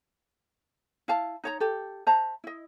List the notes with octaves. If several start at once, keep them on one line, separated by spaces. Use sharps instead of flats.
E4 F5 A5
D#4 C#5 A#5
G4 A4
C5 E5 A5 A#5
E4 D#5